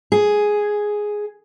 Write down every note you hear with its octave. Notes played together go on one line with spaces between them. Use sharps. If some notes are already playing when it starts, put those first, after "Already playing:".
G#4